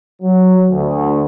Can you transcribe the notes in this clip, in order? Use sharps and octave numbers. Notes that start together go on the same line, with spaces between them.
F#3
D2